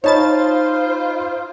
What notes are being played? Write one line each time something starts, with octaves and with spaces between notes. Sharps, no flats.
D#4 F4 C5 C#5 D#5 A5 B5 A6